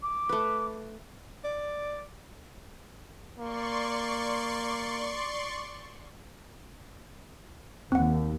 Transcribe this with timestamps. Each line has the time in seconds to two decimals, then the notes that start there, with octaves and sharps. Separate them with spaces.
0.03 D6
0.29 A3 B4
1.44 D5
3.38 A#3 D5 C6 C#6
7.92 D#2 C4 F#5